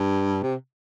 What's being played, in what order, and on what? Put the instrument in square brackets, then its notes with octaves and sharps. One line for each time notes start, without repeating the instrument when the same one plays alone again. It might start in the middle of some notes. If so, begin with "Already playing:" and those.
Already playing: [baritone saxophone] G2
C3